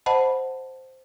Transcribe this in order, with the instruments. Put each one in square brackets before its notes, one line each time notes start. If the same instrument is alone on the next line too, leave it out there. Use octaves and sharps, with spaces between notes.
[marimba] C5 D#5 F#5 A5 B5